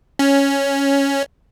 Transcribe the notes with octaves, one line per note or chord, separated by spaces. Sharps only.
C#4